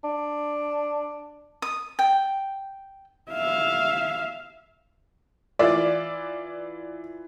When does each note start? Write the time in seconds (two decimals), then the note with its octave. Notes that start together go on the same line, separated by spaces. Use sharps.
0.04 D4
1.62 D#6
1.99 G5
3.31 E5 F5
5.59 E3 F4 D5 E5